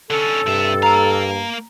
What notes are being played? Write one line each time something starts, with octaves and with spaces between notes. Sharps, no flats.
D3 C#4 A4
G2 C3 E5
A#3 F5 A#5